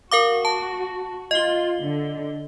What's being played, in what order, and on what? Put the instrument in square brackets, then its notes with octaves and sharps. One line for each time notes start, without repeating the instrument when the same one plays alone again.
[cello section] F#4 [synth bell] A#4 F5 D6
[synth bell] A5
[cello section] F4 [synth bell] D#5 G7
[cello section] D3